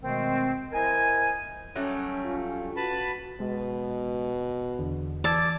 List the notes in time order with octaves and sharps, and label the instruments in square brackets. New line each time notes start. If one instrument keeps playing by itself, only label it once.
[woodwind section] B2 D#3 G#3 A3 C4
E4 A#4 C5 D#5 G#5
[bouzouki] F#3 G3 A3 [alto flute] C#4
[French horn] F4
[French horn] F#4 [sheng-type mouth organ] B4 A5 B5
[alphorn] B2 [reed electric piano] G#3
[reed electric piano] E2 D3
[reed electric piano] E3 E6 G#6 [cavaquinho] D5 A5